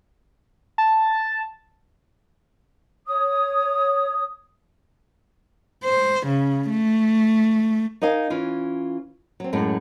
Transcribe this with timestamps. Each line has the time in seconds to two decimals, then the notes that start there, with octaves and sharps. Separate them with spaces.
0.78 A5
3.06 C#5 D#6
5.84 C5
6.27 C#3
6.69 A3
8.02 D#4 A#4 D#5 F5 G#5
8.30 E3 C#4 F4
9.40 F#3 C4
9.53 F#2 A2 F#3 G#3